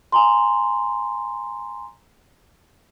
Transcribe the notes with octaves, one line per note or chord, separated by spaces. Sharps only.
G#5 A#5 C6